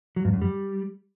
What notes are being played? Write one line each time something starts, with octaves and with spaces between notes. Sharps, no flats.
F#3
G2
F#2
G3